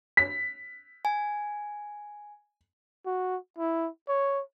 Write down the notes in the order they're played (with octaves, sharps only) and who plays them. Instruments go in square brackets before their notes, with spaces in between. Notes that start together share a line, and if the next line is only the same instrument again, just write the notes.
[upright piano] B6
[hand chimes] G#5
[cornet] F#4
E4
C#5